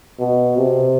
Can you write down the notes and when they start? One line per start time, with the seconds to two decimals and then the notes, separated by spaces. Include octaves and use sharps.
0.20 B2
0.58 C3